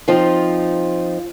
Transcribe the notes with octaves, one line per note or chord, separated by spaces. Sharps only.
F3 C4 D#4 F4